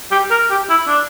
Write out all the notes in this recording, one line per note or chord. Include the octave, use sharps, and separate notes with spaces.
G4
A#4
G4
E4
D4